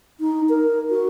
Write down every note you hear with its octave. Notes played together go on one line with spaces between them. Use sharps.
D#4
A#4
F#4